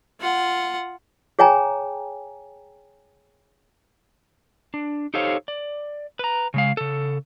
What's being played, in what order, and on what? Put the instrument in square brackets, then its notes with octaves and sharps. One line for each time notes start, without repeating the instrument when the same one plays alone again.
[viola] F4 F#5
[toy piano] G#4 C#5 G5 G#5 A#5
[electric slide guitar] D4
D#4 G4 A4 C5 C#5 F5
D5
B4 A#5
C#3 G#3 F5
C#3 A4